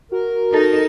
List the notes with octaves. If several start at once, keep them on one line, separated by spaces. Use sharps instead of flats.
F#4 A#4
D#4 A4